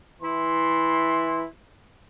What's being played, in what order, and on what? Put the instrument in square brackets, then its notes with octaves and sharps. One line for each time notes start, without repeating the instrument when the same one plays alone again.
[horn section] E3 E4 C6